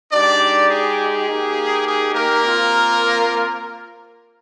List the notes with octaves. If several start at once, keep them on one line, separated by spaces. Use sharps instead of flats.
G#3 D4 D#4 G4 D5
G#4
A#3 D#4 G4
G#4
A#3 A#4
C4 F4